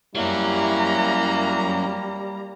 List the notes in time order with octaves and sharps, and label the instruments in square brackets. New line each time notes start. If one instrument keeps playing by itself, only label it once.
[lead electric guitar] F#3 C#4 [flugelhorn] G3 [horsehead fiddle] A#3 A#5 [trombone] E4